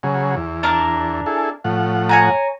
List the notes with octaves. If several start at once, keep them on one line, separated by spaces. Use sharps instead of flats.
C#3 F#3 G#4
E2
D4 A#4 A5
E4 G#4 A4
A2 F3 F#5
C#5 G#5 A#5